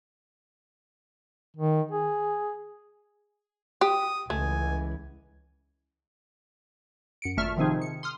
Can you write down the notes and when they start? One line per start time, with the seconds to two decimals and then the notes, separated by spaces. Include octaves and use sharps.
1.56 D#3
1.91 G#4
3.81 G4 D#6
4.30 C#2 E3 A3 G#5
7.22 F#2 C#7 D7
7.37 G#1 A#2 A3 E5 C#6 F6
7.57 C3 D#3 F3 C4 D#4 G#4
7.82 C#7
8.03 C6 D#6 F6